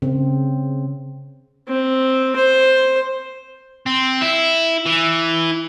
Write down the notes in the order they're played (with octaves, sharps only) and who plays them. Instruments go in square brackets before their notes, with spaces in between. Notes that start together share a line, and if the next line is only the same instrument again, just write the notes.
[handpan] C#3 C4
[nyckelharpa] C4
C5
[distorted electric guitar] C4
E4
E3